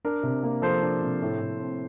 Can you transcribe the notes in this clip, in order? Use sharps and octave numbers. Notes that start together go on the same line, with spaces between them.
D4 A#4
C3
A#3
F3 A4 C5
D4
C3
A2
A2
C4